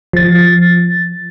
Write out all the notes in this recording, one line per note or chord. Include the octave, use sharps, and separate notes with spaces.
F3 A6